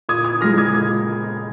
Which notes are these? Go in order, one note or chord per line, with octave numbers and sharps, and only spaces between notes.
A#2 D#6 G#6
D#6 G#6
F3 G#3 F6 A#6
D#6 G#6
A#2 D#6 G#6